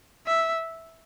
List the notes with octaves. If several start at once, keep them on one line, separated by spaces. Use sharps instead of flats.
E5